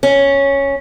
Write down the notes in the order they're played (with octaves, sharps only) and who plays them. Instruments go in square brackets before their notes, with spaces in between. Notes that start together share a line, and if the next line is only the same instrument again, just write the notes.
[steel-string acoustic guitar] C#4